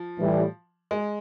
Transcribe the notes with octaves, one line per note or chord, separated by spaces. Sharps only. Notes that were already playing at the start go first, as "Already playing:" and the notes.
Already playing: F3
A2 E3 G3
G#3